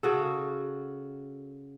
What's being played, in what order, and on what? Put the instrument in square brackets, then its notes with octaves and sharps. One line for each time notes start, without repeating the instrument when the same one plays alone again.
[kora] C#3 F#4 A4